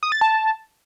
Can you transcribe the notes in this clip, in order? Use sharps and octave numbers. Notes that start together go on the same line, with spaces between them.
D#6
A6
A5